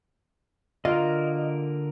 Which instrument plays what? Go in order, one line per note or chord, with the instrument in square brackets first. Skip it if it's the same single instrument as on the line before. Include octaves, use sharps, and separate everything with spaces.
[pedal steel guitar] D3 A#3 A#4 [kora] F4 [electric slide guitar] D#5